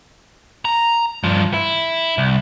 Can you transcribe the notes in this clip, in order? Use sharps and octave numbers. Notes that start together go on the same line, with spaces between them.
A#5
G2 F3
E4
C2